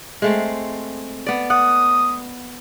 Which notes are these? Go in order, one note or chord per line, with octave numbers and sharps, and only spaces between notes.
G#3 A3 C4
B3 D5
F#5 D#6